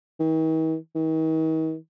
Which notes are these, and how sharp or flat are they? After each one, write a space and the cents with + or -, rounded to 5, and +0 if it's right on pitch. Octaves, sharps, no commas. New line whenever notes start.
D#3 +45
D#3 +40